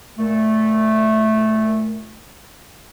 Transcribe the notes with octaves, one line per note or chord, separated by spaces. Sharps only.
A#2 A3